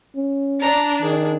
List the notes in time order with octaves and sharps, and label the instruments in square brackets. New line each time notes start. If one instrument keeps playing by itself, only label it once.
[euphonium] C#4
[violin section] D4 [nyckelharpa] A#5
[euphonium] D#3 [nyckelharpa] G#4